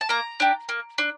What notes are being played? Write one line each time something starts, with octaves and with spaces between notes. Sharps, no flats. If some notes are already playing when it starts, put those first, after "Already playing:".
A5
A#3 A#5
D4 G4
A#3
D4